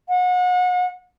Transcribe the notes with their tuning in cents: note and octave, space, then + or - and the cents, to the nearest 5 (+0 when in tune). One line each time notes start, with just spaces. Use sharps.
F#5 -35